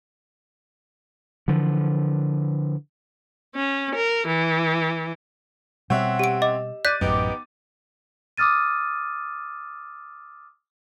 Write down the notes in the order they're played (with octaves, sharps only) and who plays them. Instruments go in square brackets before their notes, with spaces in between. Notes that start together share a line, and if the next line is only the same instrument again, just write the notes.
[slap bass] D3 E3 F3
[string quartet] C#4
A#4
E3
[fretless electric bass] B2 G3 [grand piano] C4 C#5 E5 [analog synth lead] F#5
[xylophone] G4 D7
D#5 D6
[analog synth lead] D5 [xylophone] F#6 G6 B6 [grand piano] A6 D#7
[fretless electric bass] A1 F#2 [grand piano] B3 D#4 G4 [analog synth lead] D6
[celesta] D6 D#6 F6 A6 D#7